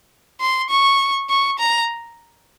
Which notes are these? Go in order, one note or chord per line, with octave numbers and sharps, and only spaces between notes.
C6
C#6
C#6
A#5